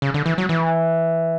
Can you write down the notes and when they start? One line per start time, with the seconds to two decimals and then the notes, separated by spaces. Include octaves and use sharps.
0.02 C#3
0.14 D3
0.26 E3
0.38 F#3
0.49 E3